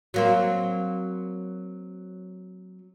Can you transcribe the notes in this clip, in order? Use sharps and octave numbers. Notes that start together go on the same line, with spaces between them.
F#3 A#3 C4